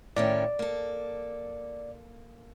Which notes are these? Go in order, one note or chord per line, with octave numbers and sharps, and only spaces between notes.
A2 D#3 C#4 D5
A#3 A4